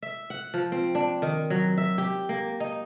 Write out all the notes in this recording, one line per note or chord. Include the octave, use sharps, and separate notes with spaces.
E5
F#5
F3
C4
D4
D#3
F#3
E5
G4
A#3
D#4